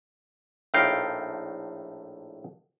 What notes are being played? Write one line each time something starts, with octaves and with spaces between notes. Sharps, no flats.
A#1 A2 A3 D#4 F5 G5